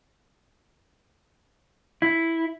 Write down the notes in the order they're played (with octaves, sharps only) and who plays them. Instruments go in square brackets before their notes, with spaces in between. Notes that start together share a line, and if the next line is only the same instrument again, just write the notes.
[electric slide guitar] E4